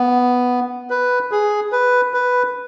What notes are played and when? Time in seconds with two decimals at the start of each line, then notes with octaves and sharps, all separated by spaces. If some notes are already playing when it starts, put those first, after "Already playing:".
Already playing: B3
0.90 B4
1.31 G#4
1.72 B4
2.14 B4